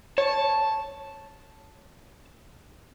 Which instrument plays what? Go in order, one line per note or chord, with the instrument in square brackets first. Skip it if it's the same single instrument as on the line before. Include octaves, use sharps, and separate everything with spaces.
[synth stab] C#5 [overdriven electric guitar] A5